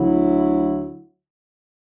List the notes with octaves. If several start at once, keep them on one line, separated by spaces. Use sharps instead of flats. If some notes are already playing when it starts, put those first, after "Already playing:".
Already playing: D2 D3 F#3 E4